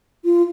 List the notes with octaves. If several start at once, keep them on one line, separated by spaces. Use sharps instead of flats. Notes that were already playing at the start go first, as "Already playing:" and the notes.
F4